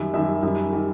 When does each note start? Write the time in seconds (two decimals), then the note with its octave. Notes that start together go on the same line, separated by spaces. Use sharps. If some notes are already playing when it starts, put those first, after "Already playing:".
Already playing: F#2 D#3 G3 E5
0.14 F#2 D#3 G3 E5
0.43 F#2 D#3 G3
0.72 D#3 G3